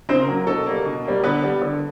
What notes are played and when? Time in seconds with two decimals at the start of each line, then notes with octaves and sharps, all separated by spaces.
0.09 C#3 C4 C5
0.21 A#4
0.28 F#3 A#3
0.47 B2 A4
0.66 G3 A#3
0.85 B2
1.05 G3 A#3
1.24 D3 B3 B4
1.43 G3 B3
1.62 D3